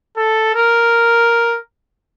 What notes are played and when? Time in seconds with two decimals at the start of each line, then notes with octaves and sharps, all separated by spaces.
0.17 A4
0.55 A#4